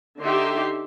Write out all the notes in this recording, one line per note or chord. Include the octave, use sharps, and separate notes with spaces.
D3 D#4 G4 E5 C6